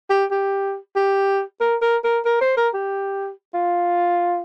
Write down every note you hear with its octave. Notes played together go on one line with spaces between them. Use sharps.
G4
G4
G4
A#4
A#4
A#4
A#4
C5
A#4
G4
F4